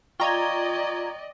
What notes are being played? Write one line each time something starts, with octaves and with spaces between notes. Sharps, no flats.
F4 D5 D#5 G5 A#5 C#6 G#6 G7